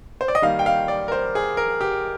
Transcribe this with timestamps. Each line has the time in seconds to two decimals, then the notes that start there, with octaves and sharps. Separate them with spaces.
0.21 C5
0.28 D5
0.35 D#5
0.42 D#3 G3 A#3 F5
0.59 G5
0.66 F5
0.88 D5
1.08 A#4
1.12 C5
1.35 G#4
1.57 A#4
1.81 G4